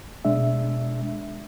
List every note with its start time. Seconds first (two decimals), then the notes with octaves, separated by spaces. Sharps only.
0.25 B2 G#3 D4 E5